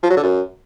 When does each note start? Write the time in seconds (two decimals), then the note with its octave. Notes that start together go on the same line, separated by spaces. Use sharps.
0.03 F3
0.10 F#3
0.17 D3
0.23 F#2